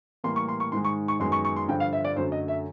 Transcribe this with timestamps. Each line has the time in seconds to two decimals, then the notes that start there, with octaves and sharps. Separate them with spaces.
0.24 A2 E3 G3 A#3 C6
0.36 C#6
0.48 C6
0.60 C#6
0.72 G#2 D#3 G#3 C6
0.85 C#6
1.08 C#6
1.20 F#2 D#3 G#3 B3 C6
1.32 C#6
1.45 C#6
1.56 C6
1.68 G2 D3 F3 G5
1.80 F5
1.93 E5
2.05 D5
2.16 F#2 D3 F#3 A3 C5
2.32 D#5
2.48 E5